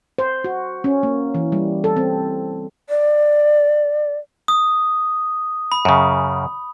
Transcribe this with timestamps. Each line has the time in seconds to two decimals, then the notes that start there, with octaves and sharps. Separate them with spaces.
0.18 C5
0.44 F#4
0.84 C#4
1.03 A#3
1.35 E3
1.52 G3
1.84 A4
1.97 C4
2.89 D5
4.48 D#6
5.72 B5
5.85 F#2 C#3